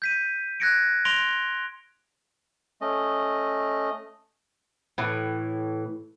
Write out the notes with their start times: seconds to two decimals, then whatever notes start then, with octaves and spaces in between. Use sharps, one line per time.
0.02 G6 B6 D#7
0.60 F#6 G#6 A#6 C#7 D7
1.05 C6 A#6 D7 F7 G7
2.81 A3 C#4 D#5
4.98 A2 E3